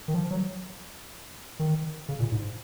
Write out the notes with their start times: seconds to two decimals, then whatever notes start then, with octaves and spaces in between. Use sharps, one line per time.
0.08 D#3
0.14 F3
0.31 F#3
1.59 D#3
2.09 C#3
2.20 A#2
2.32 G#2